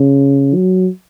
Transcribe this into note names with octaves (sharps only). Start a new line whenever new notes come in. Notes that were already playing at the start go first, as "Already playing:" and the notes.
Already playing: C#3
F#3